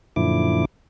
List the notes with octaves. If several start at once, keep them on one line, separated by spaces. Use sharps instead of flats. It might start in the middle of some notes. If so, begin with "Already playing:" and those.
F#2 A#2 D3 F3 E4 D6